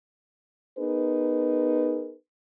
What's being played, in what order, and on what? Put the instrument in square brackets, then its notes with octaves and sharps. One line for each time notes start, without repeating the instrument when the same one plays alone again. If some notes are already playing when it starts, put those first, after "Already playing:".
[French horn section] B3 D#4 G#4 A#4 B4